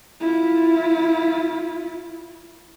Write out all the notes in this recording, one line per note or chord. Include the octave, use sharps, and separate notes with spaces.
E4 F4